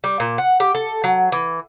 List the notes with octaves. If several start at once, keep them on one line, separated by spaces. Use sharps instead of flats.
G3
A#2
F#5
G4
A4
F#3
E3